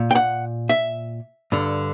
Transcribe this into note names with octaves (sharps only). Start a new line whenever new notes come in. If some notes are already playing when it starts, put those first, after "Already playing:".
Already playing: A#2
G5
F#5
E5
G2 D3